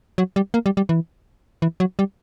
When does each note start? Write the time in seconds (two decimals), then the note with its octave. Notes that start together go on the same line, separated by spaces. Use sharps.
0.18 F#3
0.36 G3
0.54 A#3
0.66 G3
0.77 G3
0.89 E3
1.62 E3
1.80 F#3
1.99 G3